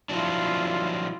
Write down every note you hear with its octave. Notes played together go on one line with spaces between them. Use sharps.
F3 F#3 D4 E4 F4